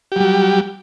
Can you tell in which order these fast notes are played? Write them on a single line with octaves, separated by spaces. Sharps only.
G4 F#3 G3